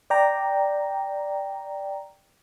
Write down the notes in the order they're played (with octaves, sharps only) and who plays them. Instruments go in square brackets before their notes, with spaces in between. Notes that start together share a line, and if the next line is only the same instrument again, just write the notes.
[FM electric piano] D5 G5 A#5